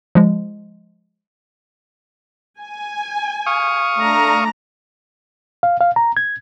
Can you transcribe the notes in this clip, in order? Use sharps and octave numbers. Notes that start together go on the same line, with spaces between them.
F3 G#3
G#5
F5 C#6 D#6
A3 D4 A#5
F5
F5
A#5
G#6